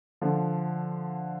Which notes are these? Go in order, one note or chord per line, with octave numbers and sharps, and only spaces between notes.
D3 F3